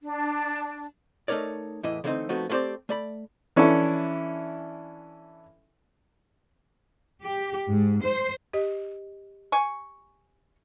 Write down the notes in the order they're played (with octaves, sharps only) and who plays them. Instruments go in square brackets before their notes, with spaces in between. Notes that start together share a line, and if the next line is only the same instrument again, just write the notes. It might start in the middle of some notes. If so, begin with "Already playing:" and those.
[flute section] D4
[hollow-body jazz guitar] A3 D#4 A#4 C#5 D5
E2 A2 E3 E4 D#5
D3 E3 A3 C4 C#4 D#4
F3 A3 B3 C4 D#4 F#4
A3 B3 C4 G4 C5 D5
A3 D5 B5
[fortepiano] E3 C#4 D4 E4 A4
[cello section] G4
G#2
C5
[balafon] G4 D#5
[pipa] G#5 C#6